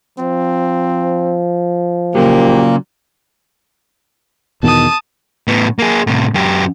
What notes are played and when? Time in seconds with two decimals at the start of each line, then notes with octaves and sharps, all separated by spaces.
0.19 F3 C4
2.15 A#2 C#3 F#3 A#3 G4
4.63 E2 B2 D#3 A5 D#6
5.48 A2 B3
5.79 A#3 G#4
6.07 A2 C3
6.34 F#2 G4